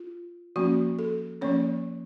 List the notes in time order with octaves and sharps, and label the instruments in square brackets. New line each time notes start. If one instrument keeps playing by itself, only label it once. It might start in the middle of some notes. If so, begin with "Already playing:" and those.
Already playing: [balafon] F4
F3 A#3 C#4 F#4
A4
F3 A#3 C#4 C#5